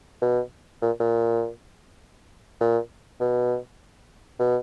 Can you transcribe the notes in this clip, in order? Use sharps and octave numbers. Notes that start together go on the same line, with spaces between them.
B2
A#2
A#2
A#2
B2
B2